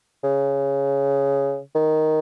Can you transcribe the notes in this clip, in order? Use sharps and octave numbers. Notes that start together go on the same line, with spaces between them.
C#3
D#3